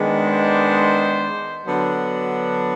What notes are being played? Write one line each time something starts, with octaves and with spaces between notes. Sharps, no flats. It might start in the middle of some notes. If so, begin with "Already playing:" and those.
Already playing: D#3 G#3 B3 D4
C5
D3 F#3 B3 D4